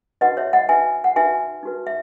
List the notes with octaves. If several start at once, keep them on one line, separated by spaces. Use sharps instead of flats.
D#4 F#4 B4 D#5 F#5
C#5 E5
D#5 F#5
D#4 F#4 B4 E5 G#5
F#5
D#4 F#4 B4 E5 G#5
D#4 F#4 B4
E5